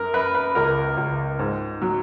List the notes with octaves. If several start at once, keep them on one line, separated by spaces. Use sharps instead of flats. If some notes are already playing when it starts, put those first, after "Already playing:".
Already playing: F#2 A#4
F#2 B4
B4
C#2 A#4
C#2
G#2
F#3